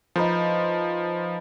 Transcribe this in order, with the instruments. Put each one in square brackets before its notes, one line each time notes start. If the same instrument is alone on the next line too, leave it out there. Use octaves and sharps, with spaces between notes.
[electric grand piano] F3 [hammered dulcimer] D#4 B4 C5